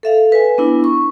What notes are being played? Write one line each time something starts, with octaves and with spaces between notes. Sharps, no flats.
A4 E5 F5
B4 G#5
B3 D4 E4
C#6